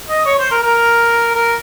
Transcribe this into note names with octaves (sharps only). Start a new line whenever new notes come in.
D#5
C#5
C5
A#4
A#4
A#4